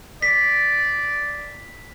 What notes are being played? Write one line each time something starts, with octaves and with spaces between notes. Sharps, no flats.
D5 B6